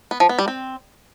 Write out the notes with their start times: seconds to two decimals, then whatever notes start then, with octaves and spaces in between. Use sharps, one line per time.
0.11 B3
0.20 F3
0.29 B3
0.39 G3
0.48 C4